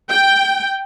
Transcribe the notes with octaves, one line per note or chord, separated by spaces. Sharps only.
G5